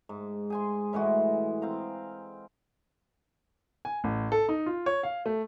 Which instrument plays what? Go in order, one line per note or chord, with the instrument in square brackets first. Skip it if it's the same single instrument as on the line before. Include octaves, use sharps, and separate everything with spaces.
[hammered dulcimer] G#2
G#4 G#5 C6
A2 E3 G#3 F#4
C4 F5 A#5
[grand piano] G#5
A1
A4
D#4
F4
C#5
F5
A3